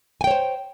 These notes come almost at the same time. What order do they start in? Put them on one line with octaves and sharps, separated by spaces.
G#5 G5 C#5 C5